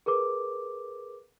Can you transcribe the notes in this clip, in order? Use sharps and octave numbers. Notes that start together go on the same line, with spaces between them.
G#4 A#4 B4 D6